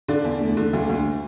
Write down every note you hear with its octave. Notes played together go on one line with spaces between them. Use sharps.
D3 D5
E2
A3
D3
D2
D2